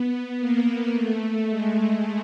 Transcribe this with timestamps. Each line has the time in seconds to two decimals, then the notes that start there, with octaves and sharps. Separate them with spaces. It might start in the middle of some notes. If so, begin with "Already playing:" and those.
Already playing: B3
0.38 A#3
0.93 A3
1.49 G#3